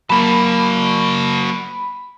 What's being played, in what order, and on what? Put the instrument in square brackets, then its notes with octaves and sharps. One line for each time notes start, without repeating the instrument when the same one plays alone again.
[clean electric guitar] F#3 A#3 [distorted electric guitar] F#4 A5 [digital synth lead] B5